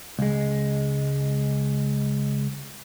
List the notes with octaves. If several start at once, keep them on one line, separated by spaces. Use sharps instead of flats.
C#2 G#3